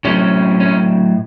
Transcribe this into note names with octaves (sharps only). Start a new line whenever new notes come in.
A2 F#3 C4 C#4
C#4